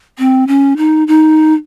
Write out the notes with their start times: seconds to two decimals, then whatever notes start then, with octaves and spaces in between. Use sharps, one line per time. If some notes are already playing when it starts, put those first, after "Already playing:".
0.19 C4
0.47 C#4
0.77 D#4
1.08 D#4